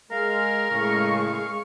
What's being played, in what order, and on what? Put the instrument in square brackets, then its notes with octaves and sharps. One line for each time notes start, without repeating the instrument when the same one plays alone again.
[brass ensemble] G#3 [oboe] A#4 [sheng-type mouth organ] F5
[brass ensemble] A2 C#3 [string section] G#3 C#6